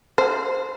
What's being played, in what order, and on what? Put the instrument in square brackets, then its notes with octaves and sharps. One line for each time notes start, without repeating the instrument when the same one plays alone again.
[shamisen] C5